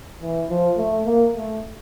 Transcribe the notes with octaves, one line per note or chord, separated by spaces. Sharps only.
E3
F3
A3
A#3
A3